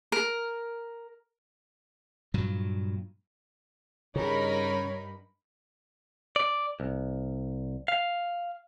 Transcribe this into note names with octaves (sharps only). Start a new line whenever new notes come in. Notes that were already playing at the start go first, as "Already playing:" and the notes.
A#4
G2 A#2 F#3
G2 C#3 D#4 A#4 C#5 B5
D5
C2
F5